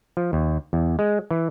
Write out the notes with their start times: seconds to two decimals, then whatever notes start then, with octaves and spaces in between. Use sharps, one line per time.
0.17 F3
0.33 D#2
0.73 E2
0.99 G#3
1.31 E3